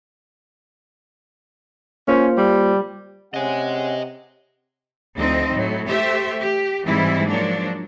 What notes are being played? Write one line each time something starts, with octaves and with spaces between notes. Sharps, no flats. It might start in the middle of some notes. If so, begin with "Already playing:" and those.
A#3 C#4 F4 C5
G3
C3 C#4 D#5 F#5 G#5
D2 F3 C4 D#4
A2 F#3
A3 G4 C5 E5
G4
G#2 E3 G3 C4 E4
F3 F#3 A#3 D4